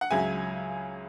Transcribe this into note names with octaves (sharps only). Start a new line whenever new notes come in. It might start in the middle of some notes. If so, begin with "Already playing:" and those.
F#5
C#2 C#3 F#3 E5 G#5